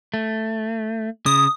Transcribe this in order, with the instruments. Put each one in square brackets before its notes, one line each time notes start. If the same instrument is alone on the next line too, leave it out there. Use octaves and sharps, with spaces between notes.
[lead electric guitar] A3
[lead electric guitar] C#3 [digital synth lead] D#6